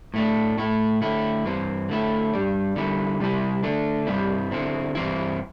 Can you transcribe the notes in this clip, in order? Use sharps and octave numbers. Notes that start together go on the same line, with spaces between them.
A2 A3 D4
A2 A3 E4
D3 A3 E4
G2 E3 C4
D3 A3 E4
G2 G3 D4
D3 G3 E4
C3 G3 E4
D3 A3 D4
G2 G3 C4 E4
D3 C4 E4
G2 E3 C4 E4